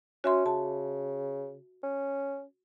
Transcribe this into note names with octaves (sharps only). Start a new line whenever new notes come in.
C#4 F#4 E5 C6
C#3 A5
C#4